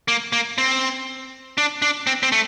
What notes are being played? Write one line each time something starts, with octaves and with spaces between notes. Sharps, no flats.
A#3
A#3
C4
D4
D4
C4
C4
A3